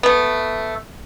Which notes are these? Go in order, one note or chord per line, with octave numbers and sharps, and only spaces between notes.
A3 B3